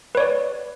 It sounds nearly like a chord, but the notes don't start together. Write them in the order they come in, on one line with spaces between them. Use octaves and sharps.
B4 C#5 D5